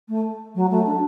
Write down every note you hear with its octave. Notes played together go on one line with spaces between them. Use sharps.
A3
F#3
A3
D4